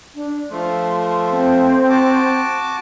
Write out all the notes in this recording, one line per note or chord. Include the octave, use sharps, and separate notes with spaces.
D4
F3 A3 C6
C4
F#4 A5 D6